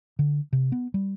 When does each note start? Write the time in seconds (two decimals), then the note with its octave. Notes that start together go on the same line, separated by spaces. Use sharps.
0.19 D3
0.53 C3
0.72 B3
0.94 G3